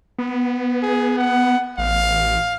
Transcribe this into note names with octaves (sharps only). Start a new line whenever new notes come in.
B3
G#4
F#5
A1 F5